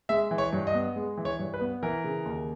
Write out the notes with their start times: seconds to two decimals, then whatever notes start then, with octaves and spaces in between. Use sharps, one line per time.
0.09 G#3 E5
0.31 E3
0.38 C#5
0.53 G2
0.67 D#5
0.74 B3
0.96 G#3
1.17 E3
1.25 C#5
1.39 G2
1.54 B4
1.61 B3
1.83 E3 A#4
2.04 C#3
2.25 D#2